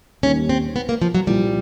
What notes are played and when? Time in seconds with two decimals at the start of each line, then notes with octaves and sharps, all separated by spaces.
0.23 D#2 D#3 G3 A#3 C#4
0.49 C4
0.76 B3
0.89 A#3
1.02 F3
1.15 F#3
1.27 C2 A#2 F3 G3